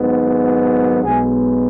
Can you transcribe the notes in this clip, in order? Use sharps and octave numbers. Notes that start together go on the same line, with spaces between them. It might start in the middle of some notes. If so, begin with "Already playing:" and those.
Already playing: G#1 G#2 F#3 B3
B1 B2 G#3 B3 G#4